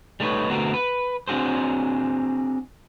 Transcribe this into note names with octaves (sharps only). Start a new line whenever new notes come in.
G3 A3 B3 D#4 B4 C#5
D3 A3 B3 C4 F#4 A#4
B4
C4 D4 F#4 G#4 C5